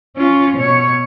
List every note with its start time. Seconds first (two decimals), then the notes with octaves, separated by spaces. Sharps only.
0.16 C#4 F4
0.57 B2 C#5